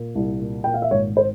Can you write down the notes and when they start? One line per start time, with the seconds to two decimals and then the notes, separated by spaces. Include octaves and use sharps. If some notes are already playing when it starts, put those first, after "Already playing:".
Already playing: A#2
0.15 C2
0.41 A#2
0.64 A#2 G5
0.74 F5
0.82 E5
0.91 G#1 C#5
1.17 C5